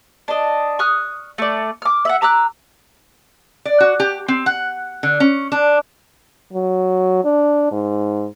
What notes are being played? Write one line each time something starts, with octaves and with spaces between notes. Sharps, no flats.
D4 D#5
C#6 D#6 F6 F#6
A3 D5
D6 F6
E5 F#5
A#5 D6 E6 F#6
D5
F#4
G4
C4
F#5
D3
C#4
D4
F#3
D4
G#2